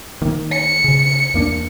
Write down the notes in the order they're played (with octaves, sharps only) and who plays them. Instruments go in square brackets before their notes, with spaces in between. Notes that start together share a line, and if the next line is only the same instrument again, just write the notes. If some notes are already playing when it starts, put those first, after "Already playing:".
[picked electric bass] D#3 A#3
[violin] C#7
[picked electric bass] C#3
E2 A#3 D4